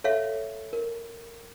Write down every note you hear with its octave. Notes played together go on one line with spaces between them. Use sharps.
A4 C#5 E5 F5
A#4